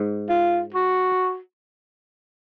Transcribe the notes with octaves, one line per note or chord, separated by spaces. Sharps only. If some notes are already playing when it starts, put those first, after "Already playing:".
Already playing: G#2
F4
F#4